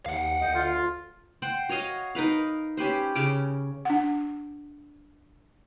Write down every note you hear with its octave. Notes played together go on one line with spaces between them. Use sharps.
D#2 F5 F#5
D2 D#5 G5
D3 F4
C5 F#5 G5
F#4 C#5 D#5 F5
D#4 A#4 B4 F5
C#4 G4 B4 C5
C#3 C#4 D6
D4 F#5